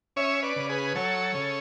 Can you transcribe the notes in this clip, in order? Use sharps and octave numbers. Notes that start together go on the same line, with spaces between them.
C#4 C#5 E5
B4 D5
C#3
G#4 B4
F#3 A4 C#5
C#3